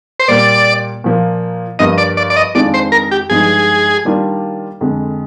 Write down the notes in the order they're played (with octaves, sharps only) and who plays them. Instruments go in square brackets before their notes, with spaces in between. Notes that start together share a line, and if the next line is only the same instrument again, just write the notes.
[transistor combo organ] C5
[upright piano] A#2 G3 A#3 [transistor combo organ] D5
[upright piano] A#2 F3 A#3
[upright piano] G2 F3 A#3 [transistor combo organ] D#5
[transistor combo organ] D5
D5
D5
D#5
[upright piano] F2 D#3 G#3 D4 F4 [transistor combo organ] D5
[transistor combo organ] C5
A#4
G4
[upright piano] G2 F3 G#3 D#4 [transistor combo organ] G#4
[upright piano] D#3 G3 A#3 D4 F4
F2 D3 G#3